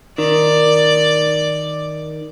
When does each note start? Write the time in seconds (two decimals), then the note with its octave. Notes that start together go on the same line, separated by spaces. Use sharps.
0.18 D#3 D5